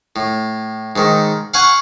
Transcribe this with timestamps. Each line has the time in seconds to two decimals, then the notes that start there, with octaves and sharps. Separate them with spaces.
0.16 A2
0.96 G#2 D#3
1.54 F5 F#5 G#5 C#6